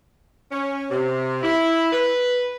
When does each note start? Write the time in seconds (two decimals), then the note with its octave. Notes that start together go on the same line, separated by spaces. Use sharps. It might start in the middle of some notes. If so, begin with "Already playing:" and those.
0.52 C#4
0.90 C3
1.43 E4
1.93 B4